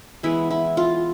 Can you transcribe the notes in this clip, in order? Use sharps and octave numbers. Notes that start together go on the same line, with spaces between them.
E3 G#3 B3 E4
E4
F4